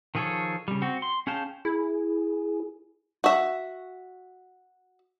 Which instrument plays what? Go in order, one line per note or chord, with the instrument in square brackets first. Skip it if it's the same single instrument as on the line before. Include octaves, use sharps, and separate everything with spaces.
[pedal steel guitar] D#3 F3 G#4 A4 C#5
C#3 G3
C4 F#4
C6
C#4 G#4 F5 G5 A5
[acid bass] E4 [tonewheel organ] G#4
[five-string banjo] F#4 E5